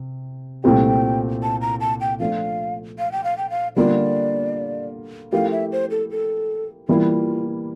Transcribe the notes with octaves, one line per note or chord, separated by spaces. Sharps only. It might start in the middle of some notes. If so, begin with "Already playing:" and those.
Already playing: C3
C2 A#2 A3 C4 G4 G5
A5
A#5
A5
G5
F3 A3 D4 F4 F5
F5
G5
F5
G5
F5
D3 G3 A#3 F4 D5
F3 A3 E4 G4 A#4 F5
E5
C5
A4
A4
E3 G3 A#3 E4 F4